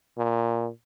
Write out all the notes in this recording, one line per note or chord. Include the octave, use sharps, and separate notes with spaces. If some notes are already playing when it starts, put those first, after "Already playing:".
A#2